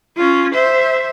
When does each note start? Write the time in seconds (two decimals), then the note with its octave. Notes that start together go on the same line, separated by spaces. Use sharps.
0.17 C#4 F4
0.54 C5 E5